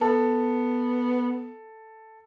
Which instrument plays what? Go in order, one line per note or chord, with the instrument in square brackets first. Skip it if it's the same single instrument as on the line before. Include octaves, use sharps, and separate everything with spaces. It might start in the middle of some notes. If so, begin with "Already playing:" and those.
[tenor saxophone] B3 [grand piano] A4